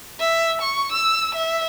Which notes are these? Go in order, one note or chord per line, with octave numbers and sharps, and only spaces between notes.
E5
C#6
E6
E5